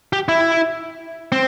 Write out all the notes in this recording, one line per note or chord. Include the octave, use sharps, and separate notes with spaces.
G4
E4
C4